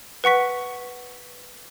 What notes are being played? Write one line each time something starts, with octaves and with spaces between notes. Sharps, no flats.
B4 F#5 C#6 B6